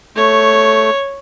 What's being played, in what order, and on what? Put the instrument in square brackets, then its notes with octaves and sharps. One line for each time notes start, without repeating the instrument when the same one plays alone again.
[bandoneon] A3 [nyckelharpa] C#5